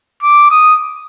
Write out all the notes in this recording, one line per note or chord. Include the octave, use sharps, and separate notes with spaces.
D6
D#6